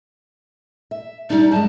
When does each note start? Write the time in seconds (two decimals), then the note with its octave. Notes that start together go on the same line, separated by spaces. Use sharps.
0.91 E5
1.30 G3 D4 D#4
1.51 F#2 G#3 A5